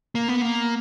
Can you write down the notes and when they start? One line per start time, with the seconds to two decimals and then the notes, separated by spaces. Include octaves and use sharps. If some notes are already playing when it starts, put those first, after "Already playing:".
0.15 A#3
0.28 B3
0.41 A#3